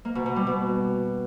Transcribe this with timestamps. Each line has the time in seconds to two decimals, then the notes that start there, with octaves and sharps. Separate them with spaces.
0.05 A#3
0.15 B2
0.26 B2
0.36 G3
0.47 B2